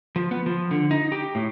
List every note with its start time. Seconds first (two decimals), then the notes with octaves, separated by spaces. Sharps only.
0.16 F3
0.31 B3
0.46 F3
0.71 D3
0.91 D#4
1.12 G4
1.35 A2